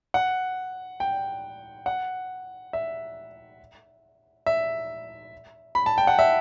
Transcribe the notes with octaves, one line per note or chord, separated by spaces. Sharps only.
F#5
G5
F#5
E5
E5
B5
A5
G5
F#5
E5